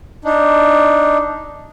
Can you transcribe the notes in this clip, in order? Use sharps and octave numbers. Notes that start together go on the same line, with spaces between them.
D4 D#4